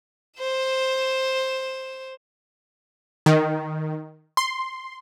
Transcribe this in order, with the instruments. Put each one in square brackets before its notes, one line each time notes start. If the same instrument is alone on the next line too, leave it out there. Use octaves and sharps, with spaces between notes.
[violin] C5 E7
[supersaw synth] D#3
C6